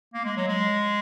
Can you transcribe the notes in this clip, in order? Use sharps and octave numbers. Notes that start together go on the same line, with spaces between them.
A#3
G#3
F#3
G#3